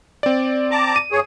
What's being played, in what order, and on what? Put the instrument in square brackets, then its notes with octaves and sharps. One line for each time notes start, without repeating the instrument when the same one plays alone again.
[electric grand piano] C4 D5
[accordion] A5 A#5 D6
[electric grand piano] D#7
[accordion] G2 G#4 C#5